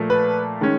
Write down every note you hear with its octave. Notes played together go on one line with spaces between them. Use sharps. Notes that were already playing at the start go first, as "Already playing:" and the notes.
Already playing: A#2 F3 A3
B4
D#3 G#3 C#4